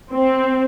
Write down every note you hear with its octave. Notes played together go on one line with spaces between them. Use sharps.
C4